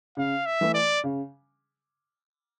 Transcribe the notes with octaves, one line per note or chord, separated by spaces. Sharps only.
C#3 F5
E5
E3 A3
D5
C#3